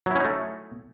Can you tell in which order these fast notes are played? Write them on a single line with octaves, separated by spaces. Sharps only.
F#3 E4 C#4 D#4 A3